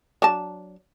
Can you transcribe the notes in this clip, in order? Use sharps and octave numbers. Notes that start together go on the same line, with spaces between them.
F#3 D4 A5